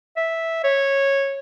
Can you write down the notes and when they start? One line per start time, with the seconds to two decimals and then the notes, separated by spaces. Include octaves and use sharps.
0.17 E5
0.64 C#5